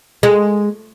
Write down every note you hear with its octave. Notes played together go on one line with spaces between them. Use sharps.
G#3